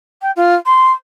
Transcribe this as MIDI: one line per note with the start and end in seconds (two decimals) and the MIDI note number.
0.22 0.31 79
0.36 0.55 65
0.66 0.91 84